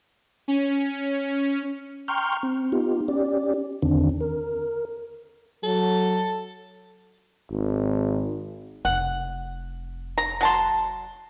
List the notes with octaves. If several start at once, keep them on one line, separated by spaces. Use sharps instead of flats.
C#4
G5 A#5 C6 C#6 F6 G6
C4
B3 D#4 F4 G4
C#4 G4 D5
E2 D3 D#3 C4 D4
A#4
F#3 A4
G#1
F1 F#5
A#5
F#3 A5 C6